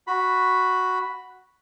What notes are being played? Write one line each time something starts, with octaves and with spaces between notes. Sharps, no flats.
F#4 B5